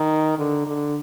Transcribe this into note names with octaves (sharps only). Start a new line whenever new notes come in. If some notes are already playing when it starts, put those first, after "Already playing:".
Already playing: D#3
D3
D3